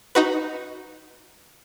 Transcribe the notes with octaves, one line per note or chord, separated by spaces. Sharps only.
D#4 F#4 B4